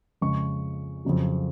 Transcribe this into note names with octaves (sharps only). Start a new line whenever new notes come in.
F2 C#3 G#3 C#6
F2 C#3 F#3